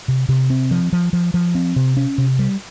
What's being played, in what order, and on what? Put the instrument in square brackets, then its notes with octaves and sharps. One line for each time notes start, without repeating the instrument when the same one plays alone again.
[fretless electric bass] C3
C3
C4
F3
F3
F3
F3
C4
C3
C#4
C3
G3